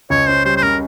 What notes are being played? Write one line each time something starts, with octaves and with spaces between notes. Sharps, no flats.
C#2 C#5
C#4 C5
G3 C5
C5
C#3 A#4